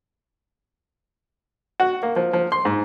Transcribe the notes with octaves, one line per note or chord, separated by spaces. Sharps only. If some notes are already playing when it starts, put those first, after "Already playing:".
F#4
A#3
F3
F3
C6
G#2